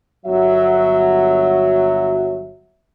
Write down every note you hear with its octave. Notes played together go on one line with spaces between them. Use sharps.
G1 F#3 F#4 E5